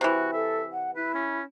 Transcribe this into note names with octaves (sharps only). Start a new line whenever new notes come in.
C3 E3 F#4
A4 E5
F#5
E4 B4
C#4